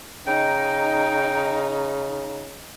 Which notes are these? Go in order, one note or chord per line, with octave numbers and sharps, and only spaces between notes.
C#3 D#4 G5